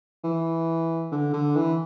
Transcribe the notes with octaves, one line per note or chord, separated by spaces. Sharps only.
E3
D3
D3
E3